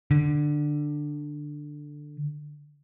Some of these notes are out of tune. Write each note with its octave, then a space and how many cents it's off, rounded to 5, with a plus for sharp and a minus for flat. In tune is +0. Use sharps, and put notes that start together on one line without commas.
D3 +10